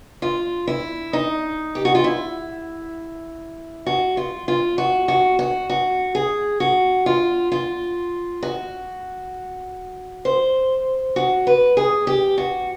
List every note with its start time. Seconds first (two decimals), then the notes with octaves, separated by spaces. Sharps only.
0.22 F4
0.67 E4
1.13 D#4
1.75 G4
1.85 F#4
1.95 F4
2.04 E4
3.86 F#4
4.17 F4
4.48 F4
4.78 F#4
5.08 F#4
5.39 F#4
5.70 F#4
6.15 G#4
6.60 F#4
7.06 F4
7.52 F4
8.43 F#4
10.25 C5
11.16 F#4
11.47 B4
11.77 G#4
12.07 G4
12.38 F#4